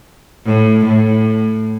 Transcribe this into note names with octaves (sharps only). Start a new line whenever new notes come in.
A2
A2